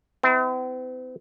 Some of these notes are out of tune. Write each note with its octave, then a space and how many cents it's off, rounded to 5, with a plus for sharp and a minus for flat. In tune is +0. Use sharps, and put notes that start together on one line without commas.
C4 -45 E4 -15